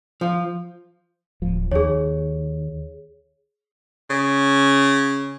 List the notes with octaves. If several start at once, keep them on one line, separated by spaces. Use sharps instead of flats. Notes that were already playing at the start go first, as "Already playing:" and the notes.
F3
D1 F3
D#2 G#4 C#5
C#3